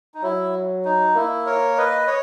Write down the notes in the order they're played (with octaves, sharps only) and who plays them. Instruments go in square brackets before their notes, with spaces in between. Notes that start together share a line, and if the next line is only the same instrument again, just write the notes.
[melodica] D#4
[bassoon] F#3 [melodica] E4
[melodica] D#4
[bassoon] A#3 [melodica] E4
[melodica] A#4 C#5
B4 D#5
C#5